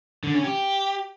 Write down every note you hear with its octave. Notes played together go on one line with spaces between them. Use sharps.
D3
C#4
G4